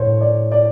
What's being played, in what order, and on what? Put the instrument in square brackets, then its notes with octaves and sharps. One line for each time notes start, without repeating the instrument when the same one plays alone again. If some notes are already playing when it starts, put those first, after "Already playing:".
Already playing: [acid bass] A2 [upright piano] C5 C#5
[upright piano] D5
D5